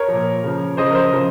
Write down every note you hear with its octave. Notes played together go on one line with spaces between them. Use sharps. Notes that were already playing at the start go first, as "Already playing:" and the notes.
Already playing: A#4 C#5
A#2 F3
C#3 F3
C#3 F3 C5 D#5
A#4
C5
C#3 F3